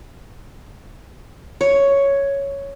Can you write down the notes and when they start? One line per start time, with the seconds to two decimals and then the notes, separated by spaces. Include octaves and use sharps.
1.61 C#5